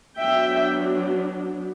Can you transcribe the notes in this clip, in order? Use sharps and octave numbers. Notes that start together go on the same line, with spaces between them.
F#3 B3 D4 E5 G5